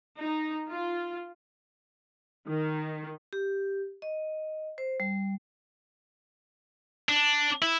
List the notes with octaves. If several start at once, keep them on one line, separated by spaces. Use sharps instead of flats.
D#4
F4
D#3
G4
D#5
C5
G3
D4
E4